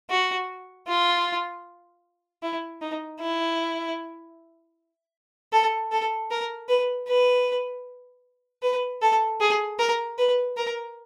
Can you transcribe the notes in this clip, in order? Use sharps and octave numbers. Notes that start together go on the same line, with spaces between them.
F#4
F4
E4
D#4
E4
A4
A4
A#4
B4
B4
B4
A4
G#4
A#4
B4
A#4